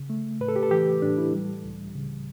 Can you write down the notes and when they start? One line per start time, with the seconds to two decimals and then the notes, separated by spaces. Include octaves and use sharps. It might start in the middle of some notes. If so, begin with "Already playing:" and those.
Already playing: C#3
0.10 A3
0.40 A2 B4
0.48 A4
0.56 G4
0.63 A4
0.71 E3 G4
1.02 A2 D4
1.18 E4
1.33 G3
1.64 C#2
1.95 C#3